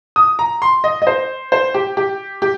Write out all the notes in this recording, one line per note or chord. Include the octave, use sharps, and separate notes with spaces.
D#6
A#5
C6
D#5
D#5
C5
C5
G4
G4
G4